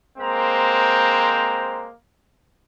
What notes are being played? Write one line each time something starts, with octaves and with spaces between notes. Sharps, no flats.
G#3 A#3 C4 C5 A#5